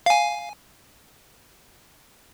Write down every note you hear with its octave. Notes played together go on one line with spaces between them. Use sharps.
F5 G#5